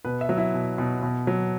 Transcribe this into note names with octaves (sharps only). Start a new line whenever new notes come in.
B2 B4
E5
F#3
E4
B2
B2
B2
F#3